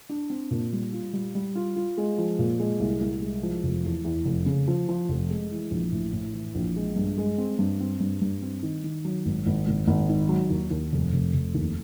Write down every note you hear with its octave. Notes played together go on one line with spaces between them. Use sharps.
D4
C4
A#2
G3
F4
G3
G3
F4
F4
G#3
F3
A#2
G#3
C2
C2
G#3
F3
F1
E2
E2
F1
C#3
F3
F3
F1
G#3
E3
A#1
A2
A2
E3
A#1
G#3
G2
G#3
C4
G2
C4
G2
G2
C4
D#3
D#3
F#3
G#1
G#1
G#1
G#1
D#3
F#3
D#2
D#2
F1
F1
F1
D#2